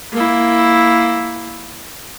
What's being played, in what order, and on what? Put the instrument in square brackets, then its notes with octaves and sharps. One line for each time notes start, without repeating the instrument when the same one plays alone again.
[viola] A#3 E4